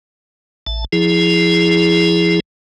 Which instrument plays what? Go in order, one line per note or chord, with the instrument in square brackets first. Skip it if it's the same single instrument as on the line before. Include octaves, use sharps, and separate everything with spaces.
[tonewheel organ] A1 A5
F3 E4 G#4